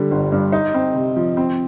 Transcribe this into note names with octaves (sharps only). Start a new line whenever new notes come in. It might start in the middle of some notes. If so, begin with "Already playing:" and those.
Already playing: D3 G3
G1
G2
D#4
C4
C3
F3
C4